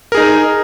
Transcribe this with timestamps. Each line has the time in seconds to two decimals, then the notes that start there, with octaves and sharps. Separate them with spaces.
0.12 A#4
0.15 G#4
0.17 D#4